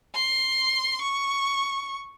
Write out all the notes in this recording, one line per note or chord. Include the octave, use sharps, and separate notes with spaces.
C6
C#6